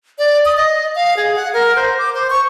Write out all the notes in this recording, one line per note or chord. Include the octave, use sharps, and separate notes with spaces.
D5
D#6
D#5
F5
G#4
F#5
A#4
C5
D6
C5
C#6